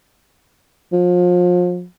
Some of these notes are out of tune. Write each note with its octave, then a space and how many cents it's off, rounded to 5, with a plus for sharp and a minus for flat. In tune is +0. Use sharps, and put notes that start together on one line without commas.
F3 +35